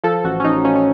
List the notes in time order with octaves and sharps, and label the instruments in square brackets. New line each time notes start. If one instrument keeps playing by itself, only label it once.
[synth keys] F3 A4
A1 F#4
C#4
A1 D#4
F3 C#4
C#4